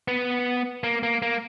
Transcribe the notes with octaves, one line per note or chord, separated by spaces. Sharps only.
B3
A#3
A#3
A#3